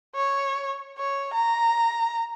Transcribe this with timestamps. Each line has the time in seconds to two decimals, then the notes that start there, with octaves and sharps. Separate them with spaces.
0.15 C#5
0.98 C#5
1.34 A#5